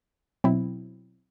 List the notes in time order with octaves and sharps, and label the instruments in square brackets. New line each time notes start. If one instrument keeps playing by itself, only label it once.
[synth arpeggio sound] B2 F#3 C4 E4